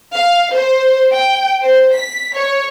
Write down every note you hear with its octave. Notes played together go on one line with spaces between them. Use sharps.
F5
C5
G5
C5
B6
C#5